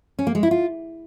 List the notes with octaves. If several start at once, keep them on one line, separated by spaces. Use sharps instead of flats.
C#4
A#3
G#3
E4
F4